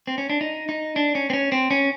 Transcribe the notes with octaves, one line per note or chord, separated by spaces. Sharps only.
C4
C#4
D4
D#4
D#4
D4
C#4
C4
C#4
C4
C#4